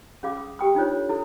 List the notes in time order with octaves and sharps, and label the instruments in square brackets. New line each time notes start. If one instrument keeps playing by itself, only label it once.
[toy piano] C#4 G#4 F5 D6
D#6
G4 G5 D#6
D4 D#4 F4 C5 C#5
A4
E4 A4 D#6